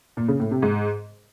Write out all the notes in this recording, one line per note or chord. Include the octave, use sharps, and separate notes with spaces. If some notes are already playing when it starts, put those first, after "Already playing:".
A#2
C#3
A2
C3
G#2